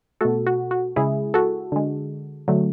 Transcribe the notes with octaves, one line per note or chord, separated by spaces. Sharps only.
B2 A3 F#4 A4
F#4
F#4
C#3 G#3 E4 G#4
F#4 A4
D3 G#3
D3 F#3 A3